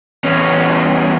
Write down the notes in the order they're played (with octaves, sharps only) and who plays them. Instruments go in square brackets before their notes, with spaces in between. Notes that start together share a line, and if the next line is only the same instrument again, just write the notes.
[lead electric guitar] E2 C#4